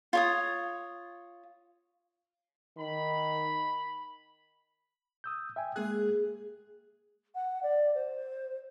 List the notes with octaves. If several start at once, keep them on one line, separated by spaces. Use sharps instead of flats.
F4 C#5 D#6
D#3 B5
D#6 E6 G6
E5 G5 G#5
G#3 A#3 G#4 F#6
F#5
D5
C5